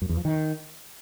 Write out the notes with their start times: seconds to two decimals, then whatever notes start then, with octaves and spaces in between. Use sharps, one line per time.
0.02 F#2
0.09 E2
0.17 F3
0.25 D#3